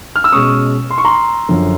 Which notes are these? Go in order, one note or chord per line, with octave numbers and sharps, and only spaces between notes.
F6
E6
B2 G#3 C#4 C#6 D#6
C6
C#6
A#5 C6
F#2 D3 F3